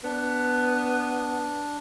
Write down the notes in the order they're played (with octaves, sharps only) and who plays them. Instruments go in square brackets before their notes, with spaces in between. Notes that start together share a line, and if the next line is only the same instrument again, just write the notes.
[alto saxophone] B3 [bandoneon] D4